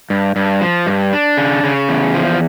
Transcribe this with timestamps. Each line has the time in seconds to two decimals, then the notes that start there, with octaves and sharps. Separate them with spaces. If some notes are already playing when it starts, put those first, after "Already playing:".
0.10 G2
0.36 G2
0.61 F3
0.87 G2
1.13 D4
1.37 C#3
1.63 C#3
1.89 E2
2.14 F3